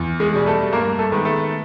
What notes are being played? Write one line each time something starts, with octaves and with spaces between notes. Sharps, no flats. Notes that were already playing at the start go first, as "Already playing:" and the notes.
Already playing: E2
G#3 G#4
B2 G3
A3 A4
G2 A#3 A#4
A3 A4
D#3 G#3 B3
A3 A4